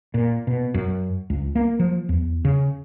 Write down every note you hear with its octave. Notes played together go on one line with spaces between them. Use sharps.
A#2
B2
F#2
C#2
A#3
F3
E2
C#3